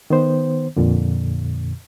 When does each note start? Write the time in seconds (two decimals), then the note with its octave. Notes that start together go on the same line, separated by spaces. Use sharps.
0.10 D#3 B3 C5
0.77 F2 A#2 D3